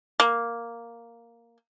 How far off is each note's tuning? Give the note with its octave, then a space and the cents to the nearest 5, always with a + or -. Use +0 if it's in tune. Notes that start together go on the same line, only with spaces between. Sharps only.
A#3 +0